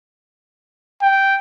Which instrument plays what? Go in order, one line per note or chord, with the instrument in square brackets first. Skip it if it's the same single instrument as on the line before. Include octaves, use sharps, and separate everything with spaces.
[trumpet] G5